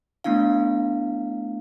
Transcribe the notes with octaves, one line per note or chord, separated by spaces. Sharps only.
A3 B3 D4 E4 F5